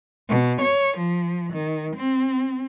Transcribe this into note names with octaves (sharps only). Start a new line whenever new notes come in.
B2
C#5
F3
D#3
C4